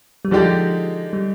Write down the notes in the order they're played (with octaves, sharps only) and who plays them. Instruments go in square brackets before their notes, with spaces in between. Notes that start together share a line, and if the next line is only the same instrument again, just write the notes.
[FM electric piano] G3
[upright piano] D3 G#3 D#4 G4 D5 [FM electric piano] F3
[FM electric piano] G3